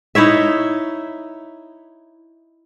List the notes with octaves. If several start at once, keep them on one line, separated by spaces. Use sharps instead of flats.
D#4 E4 C#5 E5